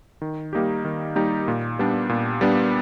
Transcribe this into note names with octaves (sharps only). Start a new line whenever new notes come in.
D#3
G3 A#3 D#4 G4
D#3
G3 A#3 D#4 G4
A#2
G3 B3 D4
A#2
G3 B3 D4